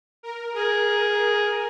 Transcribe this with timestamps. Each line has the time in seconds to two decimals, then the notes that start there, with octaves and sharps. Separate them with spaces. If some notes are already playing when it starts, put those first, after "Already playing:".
0.23 A#4
0.55 G#4 A#4